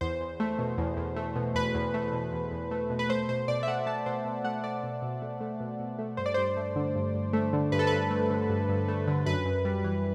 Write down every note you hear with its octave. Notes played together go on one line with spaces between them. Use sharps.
E2 C5
E2
A3
B2
E2
E2
A3
B2
E2 B4
E2
A3
B2
E2
E2
A3
B2
B4
A3 C5
B2 C5
B2 D5
E5
A3 F#5
A3 A5
B2 C5
B2
A3 F#5
A3 D5
B2
B2
A3
A3
B2
B2
A3
G2 C5
D5
G2 C5
A3
D3
G2
G2
A3
D3
G2 B4
A4
G2 B4
A3
D3
G2
G2
A3
D3
F#2 B4
F#2
G3
E3